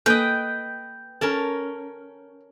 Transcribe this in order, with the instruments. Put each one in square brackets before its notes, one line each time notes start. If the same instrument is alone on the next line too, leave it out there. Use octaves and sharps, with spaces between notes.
[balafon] A#3 A4 [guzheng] B4 D#5 [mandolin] G5
[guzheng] C#4 A#4 A5 [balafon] A4